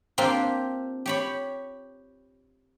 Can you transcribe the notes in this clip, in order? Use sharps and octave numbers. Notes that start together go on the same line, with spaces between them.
A#3 C4 D4 F4 G4
G4 C#5 B5